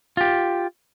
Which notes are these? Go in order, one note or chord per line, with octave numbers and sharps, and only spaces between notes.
F4 G4